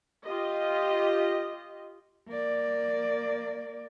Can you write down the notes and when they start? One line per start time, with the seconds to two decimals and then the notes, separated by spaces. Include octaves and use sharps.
0.25 F4 G4 D#5
2.28 A#3 D5